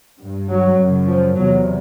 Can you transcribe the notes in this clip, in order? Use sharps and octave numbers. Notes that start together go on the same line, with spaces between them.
G2
F#3
F#2 C#3
F3
E2 C3 F#3